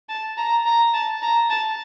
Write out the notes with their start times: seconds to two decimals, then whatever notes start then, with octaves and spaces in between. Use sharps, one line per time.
0.09 A5
0.37 A#5
0.66 A#5
0.94 A5
1.22 A#5
1.50 A5